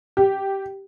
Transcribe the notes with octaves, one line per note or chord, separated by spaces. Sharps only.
G4